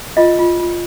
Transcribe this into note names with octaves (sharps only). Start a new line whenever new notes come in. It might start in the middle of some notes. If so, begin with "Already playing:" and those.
F4 D#5
F4
F4